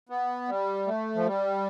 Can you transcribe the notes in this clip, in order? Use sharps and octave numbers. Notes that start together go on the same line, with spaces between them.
B3
G3
A3
F3
G3